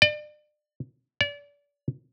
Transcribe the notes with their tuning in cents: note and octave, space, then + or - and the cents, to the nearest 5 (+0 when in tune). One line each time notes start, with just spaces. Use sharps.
D5 +35
D5 -35